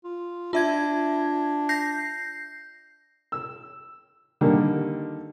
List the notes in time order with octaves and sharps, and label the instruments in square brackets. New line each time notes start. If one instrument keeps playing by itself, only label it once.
[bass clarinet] F4
[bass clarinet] D4 [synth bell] F4 E5 G#6
[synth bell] G6 A#6 C7
[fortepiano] E6
D3 D#3 G3 A#3 D#4